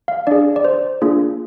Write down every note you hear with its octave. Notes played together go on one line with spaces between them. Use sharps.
F5
D4 G#4 D5
D5
C5
A#3 D4 F4 G#4